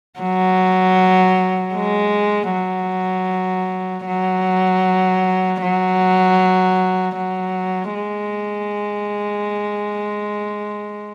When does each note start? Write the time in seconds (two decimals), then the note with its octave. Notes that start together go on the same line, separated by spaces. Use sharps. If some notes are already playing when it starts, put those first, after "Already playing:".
0.20 F#3
1.75 G#3
2.52 F#3
4.07 F#3
5.62 F#3
7.17 F#3
7.95 G#3